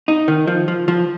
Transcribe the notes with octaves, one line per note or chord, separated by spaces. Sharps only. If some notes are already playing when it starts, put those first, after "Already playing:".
D#4
D#3
F3
F3
F3